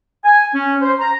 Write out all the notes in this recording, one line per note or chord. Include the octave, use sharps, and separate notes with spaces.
G#5
C#4
C5
A#5